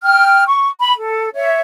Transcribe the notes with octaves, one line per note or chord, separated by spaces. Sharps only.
G5 F6
C#6
B5
A4
C#5 E5